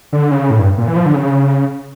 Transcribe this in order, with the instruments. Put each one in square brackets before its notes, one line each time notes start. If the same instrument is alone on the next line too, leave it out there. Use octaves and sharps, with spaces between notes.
[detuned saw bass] D3
C#3
A2
G2
A#2
E3
F3
D3
C#3